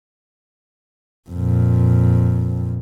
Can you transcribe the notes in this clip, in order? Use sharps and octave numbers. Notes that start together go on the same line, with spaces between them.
F2 A#2